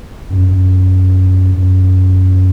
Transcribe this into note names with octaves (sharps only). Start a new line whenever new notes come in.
F#2
F#2
F#2